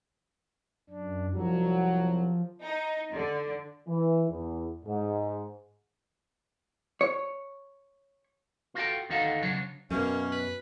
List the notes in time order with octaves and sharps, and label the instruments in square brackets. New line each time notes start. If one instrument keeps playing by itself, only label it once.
[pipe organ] F#2 D4
[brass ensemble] C2 F#3 [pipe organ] F3
[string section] D#4
D3
[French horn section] E3
E2
G#2
[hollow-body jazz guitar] C#5
[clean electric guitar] F4 F#4 A4 G5
D#2 D3 D#4 F#4 A4 F5
C#3 F#3 D4 C#5
[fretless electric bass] F#2 B2 [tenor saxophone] A#3 [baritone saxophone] C#4
[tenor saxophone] B4